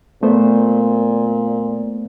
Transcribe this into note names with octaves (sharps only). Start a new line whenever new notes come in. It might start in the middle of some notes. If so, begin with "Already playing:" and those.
A#2 A3 B3 C5